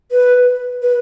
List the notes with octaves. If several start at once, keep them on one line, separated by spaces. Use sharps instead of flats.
B4
B4